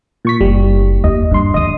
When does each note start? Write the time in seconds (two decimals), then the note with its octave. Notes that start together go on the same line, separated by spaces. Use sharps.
0.25 A#2 C#6 B6
0.40 F#1 G3
1.04 D#2 D#5
1.31 G2 D4 C6
1.54 D#3 G3 D#5 D#6